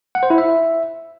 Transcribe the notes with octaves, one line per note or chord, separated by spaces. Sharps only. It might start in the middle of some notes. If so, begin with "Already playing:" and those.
F#5
C5
E4
E5